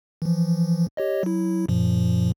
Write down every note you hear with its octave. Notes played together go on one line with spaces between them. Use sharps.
E3 F3
G4 C#5 D#5
F#3 E4
F#2 A#2 F3